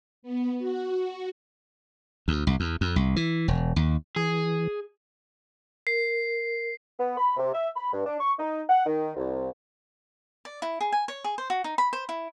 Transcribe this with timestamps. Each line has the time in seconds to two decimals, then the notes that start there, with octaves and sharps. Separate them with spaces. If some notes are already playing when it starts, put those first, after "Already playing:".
0.23 B3
0.59 F#4
2.28 D2
2.47 C2
2.60 E2
2.81 F2
2.96 C2
3.16 E3
3.48 E1
3.76 D#2
4.16 E3 G#4
5.87 A#4 C7
6.99 B3
7.18 B5
7.37 C3
7.53 E5
7.76 B5
7.93 G2
8.05 D4
8.20 C#6
8.38 D#4
8.70 F#5
8.85 D#3
9.16 C2
10.45 D5
10.62 E4
10.81 G#4
10.92 G#5
11.08 C#5
11.24 G#4
11.38 C5
11.50 F#4
11.64 D#4
11.78 B5
11.93 C5
12.09 E4